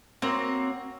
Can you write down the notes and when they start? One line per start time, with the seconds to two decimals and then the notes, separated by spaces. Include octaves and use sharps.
0.22 A#3 C4 F#4 C#5